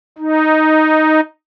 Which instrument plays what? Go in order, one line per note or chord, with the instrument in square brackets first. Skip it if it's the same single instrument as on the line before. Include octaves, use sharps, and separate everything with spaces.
[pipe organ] D#4